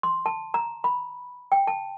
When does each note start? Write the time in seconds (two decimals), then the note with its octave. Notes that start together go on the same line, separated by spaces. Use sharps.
0.03 C6
0.26 A5
0.54 A#5
0.84 B5
1.52 G5
1.67 A5